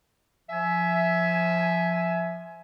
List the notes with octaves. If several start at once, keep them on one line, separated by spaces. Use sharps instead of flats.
F3 E5 G#5